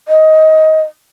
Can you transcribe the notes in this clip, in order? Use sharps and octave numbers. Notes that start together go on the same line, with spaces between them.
D#5